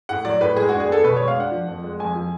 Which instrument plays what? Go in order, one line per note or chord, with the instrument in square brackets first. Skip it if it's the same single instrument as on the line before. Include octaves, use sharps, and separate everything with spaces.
[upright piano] A2 F#5
F#3 D5
A2 B4
G#3 G#4
D4 F#4
G#4
B3 A4
B2 B4
G#3 C#5
F5
D4 F#5
F3
F2
G#3
F2 G#5
F3